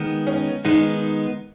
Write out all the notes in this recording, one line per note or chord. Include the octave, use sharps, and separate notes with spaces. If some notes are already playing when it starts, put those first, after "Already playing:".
Already playing: D#3 G#3 B3
C#4
D#3 G#3 B3 D#4